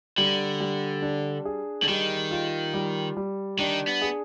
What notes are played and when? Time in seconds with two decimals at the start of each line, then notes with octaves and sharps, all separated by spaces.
0.18 D3 G3
0.60 G3
1.02 D4
1.45 G#4
1.83 D3
1.88 D#3 G3
2.31 F4
2.74 G3
3.17 G3
3.59 D#3 D4
3.87 B3
4.02 G#4